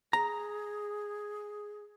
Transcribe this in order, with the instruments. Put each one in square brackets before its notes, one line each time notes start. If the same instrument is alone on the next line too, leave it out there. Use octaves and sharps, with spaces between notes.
[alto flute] G#4 [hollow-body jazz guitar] A#5